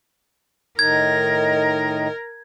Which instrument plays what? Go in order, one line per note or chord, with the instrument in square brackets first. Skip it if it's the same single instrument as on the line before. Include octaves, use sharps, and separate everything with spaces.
[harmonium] A2 D#3 D#4 [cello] A#4 [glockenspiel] G#6